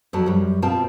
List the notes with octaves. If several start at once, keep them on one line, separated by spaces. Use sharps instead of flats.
F2 F#3 A5
F#2 G3
B2 C4 F4 A5